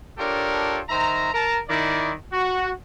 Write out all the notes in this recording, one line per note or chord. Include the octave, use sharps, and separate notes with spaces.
D4 F4 G4 A4 A#4 C#5
D#3 C5 E5 A#5
A#4 A5 A#5
D#3 E4 D5
F#4